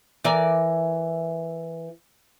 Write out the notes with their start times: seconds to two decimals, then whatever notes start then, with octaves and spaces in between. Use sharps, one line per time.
0.24 E3 A#4 D5